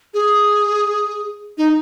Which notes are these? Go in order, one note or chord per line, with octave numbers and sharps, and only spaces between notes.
G#4
D#4